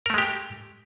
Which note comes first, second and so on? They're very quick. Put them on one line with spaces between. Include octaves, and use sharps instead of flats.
A#4 A3 G#3 G4